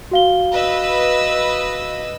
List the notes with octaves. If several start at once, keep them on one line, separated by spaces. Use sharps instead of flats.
F#4 F5 G7
B4 D#5 E6